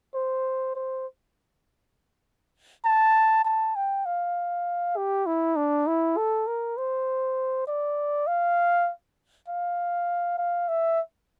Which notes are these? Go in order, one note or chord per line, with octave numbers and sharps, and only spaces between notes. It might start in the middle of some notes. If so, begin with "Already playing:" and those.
C5
C5
A5
A5
G5
F5
G4
E4
D4
E4
A4
A#4
C5
D5
F5
F5
F5
E5